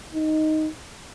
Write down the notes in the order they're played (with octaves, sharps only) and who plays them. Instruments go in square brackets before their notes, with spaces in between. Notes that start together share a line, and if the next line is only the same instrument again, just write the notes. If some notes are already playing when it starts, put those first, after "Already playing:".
[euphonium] D#4